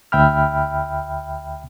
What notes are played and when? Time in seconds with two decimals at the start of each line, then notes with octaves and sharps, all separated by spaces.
0.12 D2 E5 G5 B5 F6